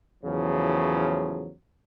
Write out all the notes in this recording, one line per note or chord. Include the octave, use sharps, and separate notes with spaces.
E2 A2 C#3 F3 F#3